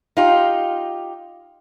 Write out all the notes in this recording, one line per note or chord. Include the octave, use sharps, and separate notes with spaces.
D#4 F4 G4